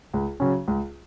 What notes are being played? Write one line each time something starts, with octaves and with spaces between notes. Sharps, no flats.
C#2
C#3 F#3 C#4
C#2